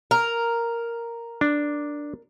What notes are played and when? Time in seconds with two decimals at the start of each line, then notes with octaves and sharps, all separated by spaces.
0.11 A#4
1.41 D4